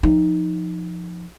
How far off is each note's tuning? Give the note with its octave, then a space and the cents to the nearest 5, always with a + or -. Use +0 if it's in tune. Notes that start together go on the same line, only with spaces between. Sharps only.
F3 +0 D#4 +5